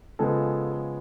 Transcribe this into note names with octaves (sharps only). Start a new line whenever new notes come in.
C#3 F3 G#3 B3 A4